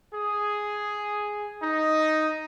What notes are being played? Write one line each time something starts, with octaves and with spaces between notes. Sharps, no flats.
G#4
D#4